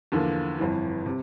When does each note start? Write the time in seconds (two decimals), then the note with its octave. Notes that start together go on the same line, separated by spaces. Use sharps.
0.12 E2 D3 F3 A#3
0.59 G1 F2 E3
1.06 C3